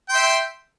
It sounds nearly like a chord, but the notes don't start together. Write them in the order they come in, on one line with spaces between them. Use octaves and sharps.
G5 C6 E5